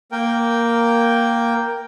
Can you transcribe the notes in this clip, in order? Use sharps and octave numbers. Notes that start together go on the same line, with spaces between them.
A#3 A#4 G5